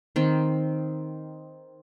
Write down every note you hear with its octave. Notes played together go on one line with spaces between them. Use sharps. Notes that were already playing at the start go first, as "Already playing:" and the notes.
D#3 C4